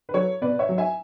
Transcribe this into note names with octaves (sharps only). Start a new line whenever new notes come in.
B4
F#3 A4 C#5
B2 B4 D5
C#5 E5
F#3
E5 G#5